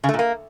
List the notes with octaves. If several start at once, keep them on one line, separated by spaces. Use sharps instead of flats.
C#3
A3
A#2
A#3